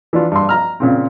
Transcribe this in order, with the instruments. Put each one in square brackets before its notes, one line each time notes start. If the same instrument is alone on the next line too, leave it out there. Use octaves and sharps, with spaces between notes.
[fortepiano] E3 D4 F4
G2 C6
A#5 F6
A#2 C#3 C4